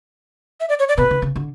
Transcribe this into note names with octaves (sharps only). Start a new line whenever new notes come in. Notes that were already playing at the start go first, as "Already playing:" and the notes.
E5
D5
C#5
D5
B2 B4
D3
C#3
D3